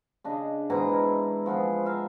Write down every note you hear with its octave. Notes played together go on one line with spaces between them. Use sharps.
C#3 D4 D#5
G#2 B2 E3 A#5
E4 A#4
F3 B3 F4 G#4
E5 F5 A#5